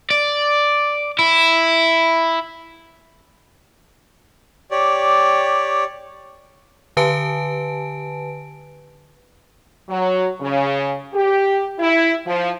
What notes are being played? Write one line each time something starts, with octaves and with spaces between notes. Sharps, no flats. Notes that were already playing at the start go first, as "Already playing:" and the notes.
D5
E4
G4 C#5 D5
D3 G4 B4 G#5 A5 D7
F#3
C#3
G4
E4
F3